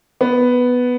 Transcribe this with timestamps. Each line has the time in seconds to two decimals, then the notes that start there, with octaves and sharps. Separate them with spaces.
0.21 B3